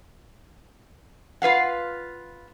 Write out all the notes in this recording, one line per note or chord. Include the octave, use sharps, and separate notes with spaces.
F4 B4 F5 F#5